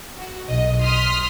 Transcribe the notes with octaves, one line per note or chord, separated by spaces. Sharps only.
F#4
B1 D#5
C6 D#6 F6 B6